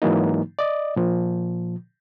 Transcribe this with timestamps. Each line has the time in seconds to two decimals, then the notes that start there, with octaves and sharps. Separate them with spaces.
0.02 G#2 E3 F#3 A#3 D#4
0.59 D5 D#5
0.96 A#2 F3